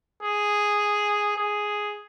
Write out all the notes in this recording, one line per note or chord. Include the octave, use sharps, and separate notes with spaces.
G#4
G#4